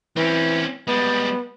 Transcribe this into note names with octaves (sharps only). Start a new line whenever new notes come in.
E3 C4 C#4
G3 G#3 B3